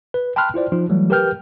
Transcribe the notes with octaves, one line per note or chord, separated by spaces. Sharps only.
B4
G5 A5 B5 C6 F6 F#6
E4 F4 C5 D5
F3 D#4 F4
E3 F#3 G3 A3
G4 A#4 B4 G5 F6 G6